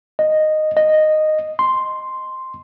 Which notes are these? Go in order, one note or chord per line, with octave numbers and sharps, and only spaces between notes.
D#5
D#5
C6